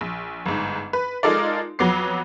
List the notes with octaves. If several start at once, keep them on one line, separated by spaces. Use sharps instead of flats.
A#1
G1 G#2
B4
G#3 D#4 F4 A4 A#4 D5
F2 F#3 B3 D6 C7